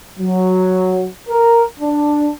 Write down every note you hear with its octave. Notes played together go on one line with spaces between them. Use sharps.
F#3
A#4
D4